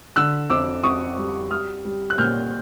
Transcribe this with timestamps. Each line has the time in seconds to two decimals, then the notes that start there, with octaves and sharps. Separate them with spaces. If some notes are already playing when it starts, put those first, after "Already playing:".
0.16 D3 E6 F#6
0.50 F2 D6 E6
0.83 F2 C#6 D#6
1.17 G3
1.51 G3 D#6 F6
1.85 G3
2.10 F#6
2.18 A#2 F6 G6